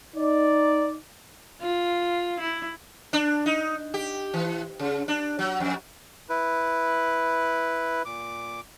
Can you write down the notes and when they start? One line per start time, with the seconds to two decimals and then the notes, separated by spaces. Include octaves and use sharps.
0.15 D#4 D5
1.61 F4
2.40 E4
3.13 D4
3.46 D#4
3.94 G4
4.34 E3
4.79 C#3
5.08 D4
5.39 F#3
5.60 F2
6.29 E4 B4
8.05 A#2 D6